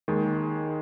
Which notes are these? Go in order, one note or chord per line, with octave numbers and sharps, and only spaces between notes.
D#2 D#3 G#3